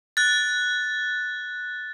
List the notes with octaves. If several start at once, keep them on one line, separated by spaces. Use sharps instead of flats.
F#6 A6